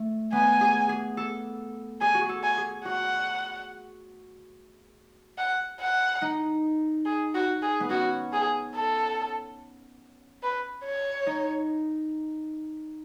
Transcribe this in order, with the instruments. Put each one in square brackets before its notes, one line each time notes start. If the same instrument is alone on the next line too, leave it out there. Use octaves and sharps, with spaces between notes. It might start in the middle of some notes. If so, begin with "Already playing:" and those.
Already playing: [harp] A3
[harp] B3 [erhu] G#5
[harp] G#4
G#4
A4
[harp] G#4 [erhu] G#5
[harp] F#4
G#4
A4
[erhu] G#5
[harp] G#4
[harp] F#4 [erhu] F#5
[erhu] F#5
F#5
[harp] D#4
[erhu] G#4
F#4
G#4
[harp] B3
[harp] C#4 [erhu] F#4
[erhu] G#4
A4
B4
C#5
[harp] D#4